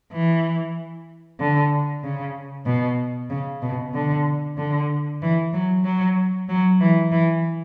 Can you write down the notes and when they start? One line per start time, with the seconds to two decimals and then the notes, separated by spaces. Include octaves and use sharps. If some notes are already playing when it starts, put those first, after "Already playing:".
0.12 E3
1.40 D3
2.04 C#3
2.66 B2
3.30 C#3
3.62 B2
3.94 D3
4.57 D3
5.22 E3
5.54 F#3
5.84 F#3
6.49 F#3
6.81 E3
7.12 E3